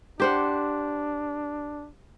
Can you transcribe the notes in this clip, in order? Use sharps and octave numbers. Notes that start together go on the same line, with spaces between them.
D4 G4 C5 F#5